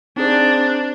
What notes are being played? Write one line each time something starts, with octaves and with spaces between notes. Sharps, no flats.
C4 D4 D#4 G#4 C5